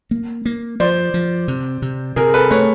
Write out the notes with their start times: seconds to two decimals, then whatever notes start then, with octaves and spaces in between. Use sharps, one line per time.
0.11 A#3
0.46 A#3
0.80 F3 C5 D5
1.14 F3
1.48 C3
1.82 C3
2.16 C3 G#4 A#4
2.34 A4 B4
2.51 A3 B4 C#5